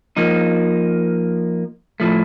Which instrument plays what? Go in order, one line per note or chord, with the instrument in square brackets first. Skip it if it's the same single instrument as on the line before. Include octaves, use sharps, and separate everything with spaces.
[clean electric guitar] F3 A#3 D#4
A2 F3 A3